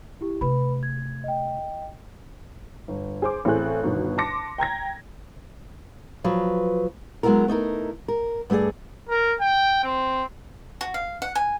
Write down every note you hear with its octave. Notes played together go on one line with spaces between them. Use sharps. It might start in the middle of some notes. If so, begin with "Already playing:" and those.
E4 G4
C3 A3 B4 B5
G#6
D#5 G5
G1
G#4 C5 D6
A1 A3 C4 G#4 F#6
G1 B2 D#3
A5 C6 D6 A#6 C#7
G5 A#5 G#6 A#6
F3 F#3 B4
F#3 G#3 A#3 B3 E4 A#4
A3 D#4 E4 A#4
A#4
G2 A3 F4 G#4 D5
A#4
G5
C4
F#4
F5
F#5
G#5